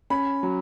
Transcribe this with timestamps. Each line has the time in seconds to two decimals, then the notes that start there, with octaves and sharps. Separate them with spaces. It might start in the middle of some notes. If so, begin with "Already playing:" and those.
0.10 C#4 B5
0.43 F#3